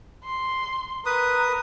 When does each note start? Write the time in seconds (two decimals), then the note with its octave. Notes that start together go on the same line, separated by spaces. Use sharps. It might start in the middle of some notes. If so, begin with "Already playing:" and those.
0.24 C6
1.06 A#4 B4 D#6